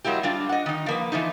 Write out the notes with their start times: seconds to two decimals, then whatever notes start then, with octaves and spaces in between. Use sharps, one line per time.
0.04 F#3 G#3 A#3 E4 G4
0.23 G3 D4 F4
0.49 D#5 F#5
0.66 D#3 D#4
0.86 F3 A#3 B4
1.12 E3 F3 A3 D#4